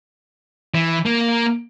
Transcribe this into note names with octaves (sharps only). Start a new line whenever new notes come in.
E3
A#3